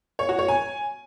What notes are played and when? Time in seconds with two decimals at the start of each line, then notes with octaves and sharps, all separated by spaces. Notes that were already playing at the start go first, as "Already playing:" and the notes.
0.19 C#5
0.29 F#4
0.39 C#5
0.48 G#5